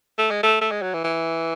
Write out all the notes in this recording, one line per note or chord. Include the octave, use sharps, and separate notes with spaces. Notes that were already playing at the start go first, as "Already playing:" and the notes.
A3
G#3
A3
A3
G#3
F#3
E3
E3